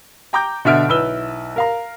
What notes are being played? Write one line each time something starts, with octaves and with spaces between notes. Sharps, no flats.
G5 A#5 D6 G6
B2 D3 E5 F6 D7
B1 E4 B4 E6 G7
A#4 F5 A#5